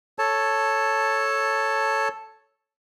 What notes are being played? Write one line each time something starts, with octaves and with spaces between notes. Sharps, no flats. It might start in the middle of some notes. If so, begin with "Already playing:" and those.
A4 C#5 A5